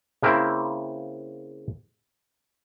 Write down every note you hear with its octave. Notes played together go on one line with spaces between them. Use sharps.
C#3 A#3 C4 E4